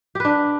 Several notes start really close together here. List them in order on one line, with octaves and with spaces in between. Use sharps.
G4 B4 D4